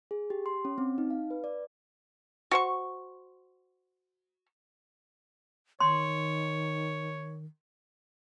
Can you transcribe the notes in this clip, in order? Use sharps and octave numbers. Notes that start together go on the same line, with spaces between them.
G#4
G4
C6
C#4
C4
D#4
F5
B4
D5
F#4 C5 C#6
D#3 C#5 C6